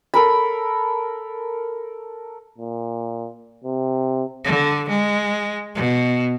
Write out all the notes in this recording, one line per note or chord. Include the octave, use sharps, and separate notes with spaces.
A4 A#4 B5
A#2
C3
D3
G#3
B2